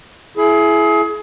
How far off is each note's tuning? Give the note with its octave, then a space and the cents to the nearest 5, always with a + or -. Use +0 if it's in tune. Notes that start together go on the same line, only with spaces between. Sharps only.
E4 +15 G#4 +30